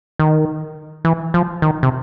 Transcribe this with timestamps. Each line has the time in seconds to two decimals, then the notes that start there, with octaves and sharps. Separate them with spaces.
0.19 D#3
1.05 E3
1.34 F3
1.62 D#3
1.83 C3